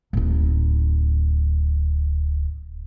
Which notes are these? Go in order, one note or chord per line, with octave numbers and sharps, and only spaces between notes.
D1 D#4